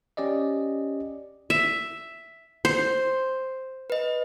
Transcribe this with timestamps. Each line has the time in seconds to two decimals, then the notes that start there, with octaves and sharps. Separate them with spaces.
0.17 C#4 G4 D5 D#5
1.50 E5
2.65 C5
3.90 B4 D#5